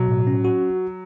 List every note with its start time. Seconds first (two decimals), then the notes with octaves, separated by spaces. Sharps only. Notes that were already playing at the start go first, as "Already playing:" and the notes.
Already playing: B2 F#3
0.08 A2
0.27 C#4
0.45 F#4